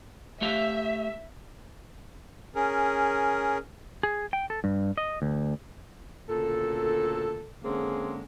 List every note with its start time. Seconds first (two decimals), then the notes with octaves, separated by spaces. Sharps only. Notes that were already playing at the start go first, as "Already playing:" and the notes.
0.42 A3 G4 E5 F5
2.55 C#4 G#4 A#4
4.03 G#4
4.33 G5
4.50 A4
4.64 G2
4.98 D#5
5.22 D2
6.29 D2 A#2 C#3 A4
7.63 D3 G#3 A#3 C4 C#4 G#4